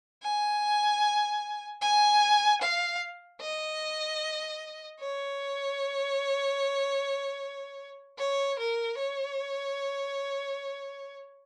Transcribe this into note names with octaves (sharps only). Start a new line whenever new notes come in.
G#5
G#5
F5
D#5
C#5
C#5
A#4
C#5